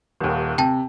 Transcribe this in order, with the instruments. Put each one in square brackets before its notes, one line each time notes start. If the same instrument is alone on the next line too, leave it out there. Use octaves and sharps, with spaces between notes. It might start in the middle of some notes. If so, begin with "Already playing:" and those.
[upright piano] D#1 D#2
[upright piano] C3 [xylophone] G5 A5